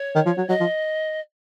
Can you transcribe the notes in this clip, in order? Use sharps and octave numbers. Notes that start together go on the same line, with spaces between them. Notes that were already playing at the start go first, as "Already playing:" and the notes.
Already playing: C#5
D#3
F3
F#3
F#3 D#5
F3